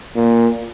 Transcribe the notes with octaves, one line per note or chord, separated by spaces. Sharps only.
A#2